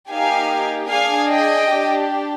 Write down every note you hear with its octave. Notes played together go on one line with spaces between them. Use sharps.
A#3 D#4 G4 F5 G#5
D4 G#4 F5 G#5
D#5 G5
D4 G4